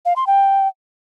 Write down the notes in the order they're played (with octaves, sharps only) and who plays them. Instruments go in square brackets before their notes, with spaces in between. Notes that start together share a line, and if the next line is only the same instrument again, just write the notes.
[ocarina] F5
C6
G5